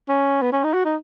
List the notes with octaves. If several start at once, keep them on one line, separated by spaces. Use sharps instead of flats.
C#4
B3
C#4
D#4
F#4
D#4